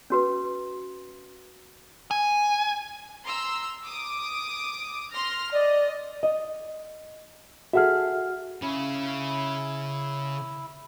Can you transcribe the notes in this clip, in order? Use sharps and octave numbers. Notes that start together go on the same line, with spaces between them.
C#4 F#4 B4
G#5
A#5 C6 E6
D6 D#6
C6 F6 A#6
D5 D#5
D#5
F#4 G#4 A4 E5 F#5 F6
C#3 E4